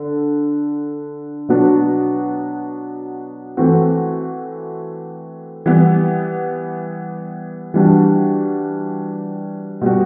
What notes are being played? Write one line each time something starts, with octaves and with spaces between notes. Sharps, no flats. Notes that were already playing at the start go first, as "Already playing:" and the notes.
Already playing: D3
B2 F#3 B3 D4 F#4
E3 A3 C4 F#4
E3 G3 B3
E3 G3 D4 F#4
B2 G3 B3 F#4